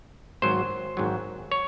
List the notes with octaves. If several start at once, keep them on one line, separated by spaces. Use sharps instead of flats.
G#1 G#2 F#3 C5
G#1 G#2 F#3
C#5